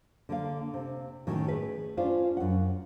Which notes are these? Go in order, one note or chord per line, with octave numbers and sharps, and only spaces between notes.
D3 A#3 F5
C3
A2 D#3 C#4 F#4
G#4 B4
C#4 D4 F4 C5
F#2 F#5